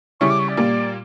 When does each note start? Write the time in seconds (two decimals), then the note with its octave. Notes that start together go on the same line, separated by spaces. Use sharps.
0.21 C#3 G3 C#4 E4 C#6
0.30 D6
0.39 C#6
0.49 D5
0.57 A#2 G3 A#3